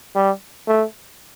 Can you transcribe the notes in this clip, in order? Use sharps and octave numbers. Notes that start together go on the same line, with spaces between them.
G3
A3